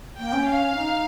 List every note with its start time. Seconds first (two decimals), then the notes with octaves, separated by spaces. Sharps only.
0.19 A#3 G5
0.33 C#4
0.47 F5
0.75 D#4